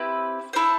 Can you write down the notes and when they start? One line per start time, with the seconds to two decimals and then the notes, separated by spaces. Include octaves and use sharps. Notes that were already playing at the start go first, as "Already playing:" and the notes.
Already playing: C4 E4 G4 B4
0.53 E4 A4 C5